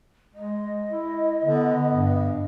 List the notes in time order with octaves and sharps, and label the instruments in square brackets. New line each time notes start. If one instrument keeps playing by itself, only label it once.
[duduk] G#3 [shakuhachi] D#5
[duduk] E4
[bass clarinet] D3 [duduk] B3
[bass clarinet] G2